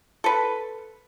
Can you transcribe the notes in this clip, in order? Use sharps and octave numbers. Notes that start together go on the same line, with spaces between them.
A4 B4